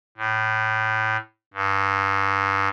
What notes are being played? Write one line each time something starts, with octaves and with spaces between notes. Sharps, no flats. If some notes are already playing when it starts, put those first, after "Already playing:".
A2
G2